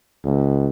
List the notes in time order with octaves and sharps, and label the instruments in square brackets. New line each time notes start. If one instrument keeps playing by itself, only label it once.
[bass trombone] C#2